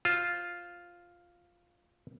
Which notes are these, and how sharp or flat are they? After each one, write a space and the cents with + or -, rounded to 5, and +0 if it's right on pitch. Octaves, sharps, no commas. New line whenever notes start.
F4 +0 C5 +0